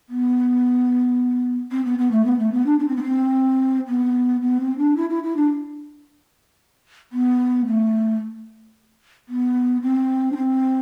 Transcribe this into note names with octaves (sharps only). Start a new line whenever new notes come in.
B3
C4
B3
B3
A3
B3
A3
B3
D4
D4
C4
B3
C4
B3
B3
C4
D4
E4
E4
E4
D4
B3
A3
B3
C4
D4
C4